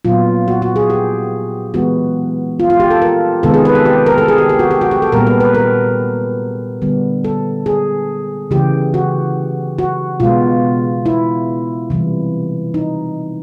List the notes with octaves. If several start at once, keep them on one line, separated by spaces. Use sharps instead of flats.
A#2 F#3 B3 F4
F#4
F#4
G#4
G4
E3 G#3 B3 F#4
F4
F4
G4
A4
A#4
C3 D#3 G#3 B3 A4
G#4
B4
A4
G4
A#4
A4
G#4
G4
G4
F#4
G4
F#4
G4
A4
A#2 G3 B3 A#4
B4
B4
A#4
D3 G3 B3
A4
G#4
C#3 E3 A3 G4
F#4
F#4
B2 G#3 B3 F4
E4
C3 E3 G3
D#4